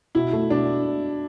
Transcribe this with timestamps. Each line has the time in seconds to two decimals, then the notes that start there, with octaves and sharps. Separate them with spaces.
0.15 B2 E4
0.33 A3
0.50 B2 D4